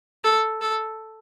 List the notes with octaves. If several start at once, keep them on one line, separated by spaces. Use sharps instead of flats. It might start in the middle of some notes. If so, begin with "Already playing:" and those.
A4
A4